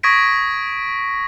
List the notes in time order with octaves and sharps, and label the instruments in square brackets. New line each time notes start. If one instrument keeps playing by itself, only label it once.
[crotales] C#6 D#6 G#6 A#6 B6 D7